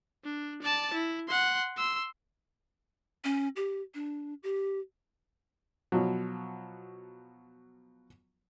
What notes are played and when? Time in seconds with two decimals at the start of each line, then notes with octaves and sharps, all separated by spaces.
0.24 D4
0.62 D5 A5
0.93 E4
1.28 F#5 C6
1.77 C6 E6
3.24 C#4
3.56 G4
3.94 D4
4.43 G4
5.92 B2 F3 F#3